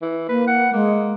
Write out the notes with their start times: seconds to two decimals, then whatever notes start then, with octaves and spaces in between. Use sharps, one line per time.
0.02 E3
0.29 A#3 B4
0.47 F#5
0.73 G#3 A#3